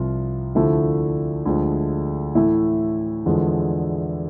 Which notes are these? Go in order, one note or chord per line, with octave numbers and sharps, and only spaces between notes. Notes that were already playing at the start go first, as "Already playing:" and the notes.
Already playing: C2 C3 F3 F4
D2 D3 F3 A3 E4
D2 D3 F3 G#3
A2 E3 A3 E4
E2 D3 F3 G#3